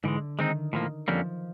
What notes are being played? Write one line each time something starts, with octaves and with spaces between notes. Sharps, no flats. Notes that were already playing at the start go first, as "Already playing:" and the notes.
G#2 D3 E3 G#3
D#3 G#3 C4 D#4
A2 F3 A#3
F2 D3 F3 G3 A#3 C#4